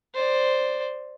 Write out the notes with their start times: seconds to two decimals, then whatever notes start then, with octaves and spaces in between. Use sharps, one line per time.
0.15 C5 D5